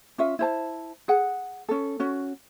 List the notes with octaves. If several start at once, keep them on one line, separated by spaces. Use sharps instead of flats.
C#4 F4 E5
E4 C5 A5
G#4 F#5
C#4 A4
C#4 F#4